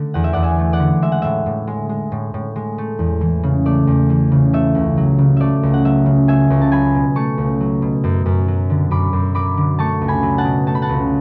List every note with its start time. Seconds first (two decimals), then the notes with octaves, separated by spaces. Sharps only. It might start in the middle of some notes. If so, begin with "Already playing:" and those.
Already playing: D3 A3
0.14 E2 F#5
0.24 E5
0.33 E2 D5 F#5
0.43 E5 G#5
0.59 A3
0.73 D5 F#5
0.80 D3
1.02 G#3 E5
1.12 F#5
1.22 A2 E5
1.46 A2
1.67 G#3
1.89 G#3
2.12 A2
2.34 A2
2.56 G#3
2.78 A3
2.99 E2
3.21 E3
3.43 C#3
3.65 A3 D5
3.87 E2
4.10 E3
4.32 C#3
4.53 A3 E5
4.75 C#2
4.97 F#3
5.18 C#3
5.37 A3 D5 E5
5.63 C#2
5.74 F#5
5.85 F#3 E5
6.06 C#3
6.28 A3 E5 G#5
6.50 C#2
6.61 A5
6.72 F#3 G#5 B5
6.95 B2
7.16 A3 A5 C#6
7.38 C#2
7.60 F#3
7.82 B2
8.04 F#2
8.26 F#2
8.48 F#3
8.70 D3
8.91 F#2 B5 D6
9.13 F#2
9.35 F#3 B5 D6
9.57 D3
9.79 A3 A5 C#6
10.01 C#2
10.08 G#5 B5
10.23 F#3
10.38 F#5 A5
10.45 B2
10.67 A3 A5
10.75 B5
10.82 F#5 A5
10.89 C#2